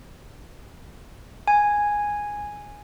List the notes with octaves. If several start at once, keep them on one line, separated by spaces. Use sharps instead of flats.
G#5